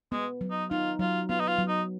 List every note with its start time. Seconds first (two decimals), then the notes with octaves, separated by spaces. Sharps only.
0.12 G#3 B3
0.41 F#3
0.51 D#4
0.71 D#4 F4
0.99 F#3 F4
1.29 B3 F4
1.40 D#4
1.48 F4
1.58 F#3
1.68 D#4